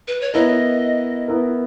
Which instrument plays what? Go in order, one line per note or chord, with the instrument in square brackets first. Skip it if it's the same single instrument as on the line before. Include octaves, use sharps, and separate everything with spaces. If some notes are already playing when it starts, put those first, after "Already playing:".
[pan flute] B4
C#5
[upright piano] B3 E4 A#4 [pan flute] D#5
[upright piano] B3 E4 A#4